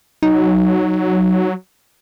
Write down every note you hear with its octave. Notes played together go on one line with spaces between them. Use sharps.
F#3 D#4